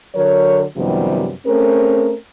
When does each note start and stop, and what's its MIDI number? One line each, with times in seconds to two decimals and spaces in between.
0.15 0.63 50
0.15 0.63 54
0.15 0.63 70
0.15 0.63 73
0.77 1.32 42
0.77 1.32 48
0.77 1.32 51
0.77 1.32 53
0.77 1.32 55
0.77 1.32 59
1.46 2.15 57
1.46 2.15 60
1.46 2.15 61
1.46 2.15 68
1.46 2.15 70